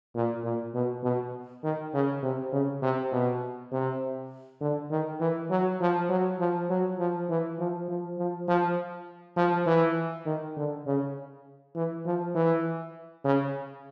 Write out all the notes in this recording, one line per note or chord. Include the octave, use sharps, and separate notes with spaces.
A#2
A#2
B2
B2
D#3
C#3
C3
C#3
C3
B2
C3
D3
D#3
E3
F#3
F3
F#3
F3
F#3
F3
E3
F3
F3
F3
F3
F3
E3
D#3
D3
C#3
E3
F3
E3
C#3